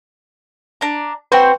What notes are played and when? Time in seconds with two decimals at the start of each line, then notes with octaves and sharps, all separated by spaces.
0.81 D4 A#5
1.32 C4 F#4 B4 C5 G5